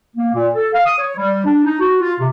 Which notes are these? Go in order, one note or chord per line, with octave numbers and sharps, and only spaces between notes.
A#3
A#2
A4
F5
D#6
C#5
G3
D4
D#4
F#4
F4
C3